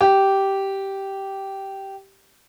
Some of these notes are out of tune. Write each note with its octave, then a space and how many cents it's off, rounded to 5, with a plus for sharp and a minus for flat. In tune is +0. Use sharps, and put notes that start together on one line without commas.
G4 -10